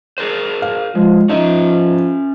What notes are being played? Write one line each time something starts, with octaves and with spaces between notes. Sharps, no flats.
G#4 A#4 C5
F5
F3 G#3
F3 C#4 D#4 E5